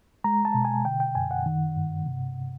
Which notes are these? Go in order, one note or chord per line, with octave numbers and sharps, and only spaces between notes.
G#3 A#5
A5
B2
G#5
D3 G5
G5
F#2 G#5
F#5
D#3
G2
C3